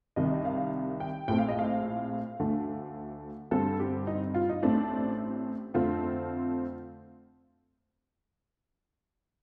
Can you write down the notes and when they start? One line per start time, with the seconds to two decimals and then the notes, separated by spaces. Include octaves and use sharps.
0.16 C2 C3 D#3 D#5
0.45 F5
1.00 G5
1.28 A#1 A2 A3 C4 G5
1.38 F5
1.49 D#5
1.59 F5
2.40 D2 D3 A3
3.51 G2 D3 G3 C4 A4
3.80 G4
4.07 D#4
4.34 F4
4.49 D#4
4.63 A1 A2 A3 C4 D4
5.74 F2 D3 A3 C4 F4